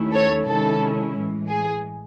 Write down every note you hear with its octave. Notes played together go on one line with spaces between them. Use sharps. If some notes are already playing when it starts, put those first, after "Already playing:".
Already playing: D#2 D#3 A3 C#4 E4
A4 C#5
C3 D#3 G#3 C#4 E4 A4
A2 E3 G#3
G#4